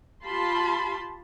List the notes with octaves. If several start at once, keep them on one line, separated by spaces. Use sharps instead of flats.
F4 G4 A5 B5 C6